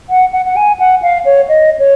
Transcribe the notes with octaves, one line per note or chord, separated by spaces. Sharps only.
F#5
F#5
F#5
G#5
F#5
F5
C#5
D#5
C#5